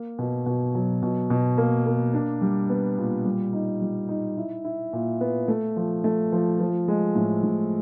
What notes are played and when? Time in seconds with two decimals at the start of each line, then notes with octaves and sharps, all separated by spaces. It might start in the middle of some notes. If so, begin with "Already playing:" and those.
Already playing: A#3
0.19 B2
0.46 B2
0.75 F#3
1.03 B2
1.30 B2
1.58 A#3
1.86 A#3
2.14 D4
2.41 G3
2.70 B3
2.98 A#2
3.25 G3
3.53 D#4
3.82 G3
4.09 D#4
4.37 E4
4.65 E4
4.93 A#2
5.21 B3
5.48 A3
5.76 F3
6.04 A3
6.32 F3
6.60 F3
6.88 G#3
7.16 A2
7.43 A2